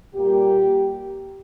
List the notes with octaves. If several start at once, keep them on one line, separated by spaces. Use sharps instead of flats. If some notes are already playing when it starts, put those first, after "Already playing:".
A#2 G3 A#3 G4